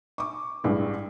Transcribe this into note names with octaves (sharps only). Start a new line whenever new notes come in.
C#6 D6
A1 G2 G#3